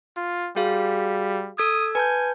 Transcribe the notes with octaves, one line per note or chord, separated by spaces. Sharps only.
F4
G3 F#4 G#4 F5
A4 D#6 E6 G#6
B4 G#5 A5 G6